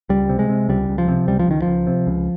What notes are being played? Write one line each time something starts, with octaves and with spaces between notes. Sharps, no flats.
C#2 G3
C3
G#3
C3
C#2 G3
C#2
F3
C3
C#2 G3
F3
C#2 D#3
C#2 F3
C3
C#2